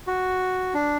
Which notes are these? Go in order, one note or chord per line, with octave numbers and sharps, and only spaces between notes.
F#4
D4